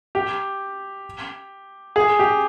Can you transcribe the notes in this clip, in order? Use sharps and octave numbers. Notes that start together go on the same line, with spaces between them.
G4
G#4
G4